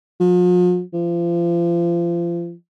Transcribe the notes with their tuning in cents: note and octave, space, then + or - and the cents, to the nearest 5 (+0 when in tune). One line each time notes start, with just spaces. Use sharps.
F3 +45
F3 -30